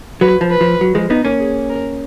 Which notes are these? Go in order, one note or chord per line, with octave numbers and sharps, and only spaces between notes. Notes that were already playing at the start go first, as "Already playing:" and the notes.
F#3 B4
F3
B4
F3
F#3
F3 G#3
B3 D#4
A#3 C#4
G#4
A#4